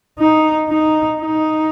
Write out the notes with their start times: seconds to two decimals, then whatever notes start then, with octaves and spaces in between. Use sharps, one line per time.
0.19 D#4
0.69 D#4
1.20 D#4